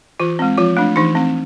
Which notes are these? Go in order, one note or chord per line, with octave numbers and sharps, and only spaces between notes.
E3 F4
G#3 C4
F3 F4
A3 D4
E3 D#4
A3 C4